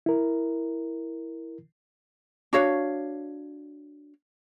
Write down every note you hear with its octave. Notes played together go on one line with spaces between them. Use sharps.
E4 A#4
D4 F#4 C#5 F5